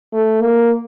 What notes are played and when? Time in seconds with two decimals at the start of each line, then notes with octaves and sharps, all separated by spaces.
0.13 A3
0.41 A#3